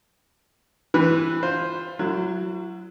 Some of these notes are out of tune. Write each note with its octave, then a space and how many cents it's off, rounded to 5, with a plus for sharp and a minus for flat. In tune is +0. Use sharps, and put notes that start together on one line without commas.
E3 +0 C4 +25 B4 -5
F4 +15 C5 +0
F#3 +0 E4 +40 A4 +45